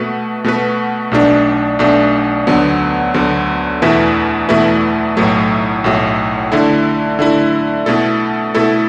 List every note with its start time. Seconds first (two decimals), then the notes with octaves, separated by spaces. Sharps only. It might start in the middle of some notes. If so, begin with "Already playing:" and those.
Already playing: B2 A3 F#4 B4
0.44 B2 A3 F#4 B4
1.11 B1 B2 A3 D4
1.79 B1 B2 A3 D4
2.47 D2 D3 F#3 B3
3.14 D2 D3 F#3 B3
3.82 E2 B2 A3 E4 B4
4.49 E2 B2 A3 E4 B4
5.17 B1 A2 F#3 A3
5.84 B1 A2 F#3 A3
6.52 D3 A3 E4
7.19 D3 A3 E4
7.86 B2 A3 E4 A4
8.55 B2 A3 E4 A4